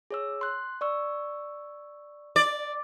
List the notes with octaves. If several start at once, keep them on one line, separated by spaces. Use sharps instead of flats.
G#4 C#5 E6
C6 F#6
D5 C#6 E6
D5